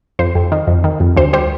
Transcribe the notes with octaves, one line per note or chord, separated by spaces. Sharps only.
F2 C5
F2
D#3
F2
D#3
F2
D2 C5
G3 C5